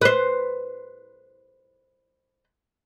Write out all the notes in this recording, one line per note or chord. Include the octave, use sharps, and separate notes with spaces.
B4 C5